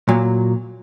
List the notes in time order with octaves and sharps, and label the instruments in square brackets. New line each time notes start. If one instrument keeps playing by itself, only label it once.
[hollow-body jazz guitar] A#2 F#3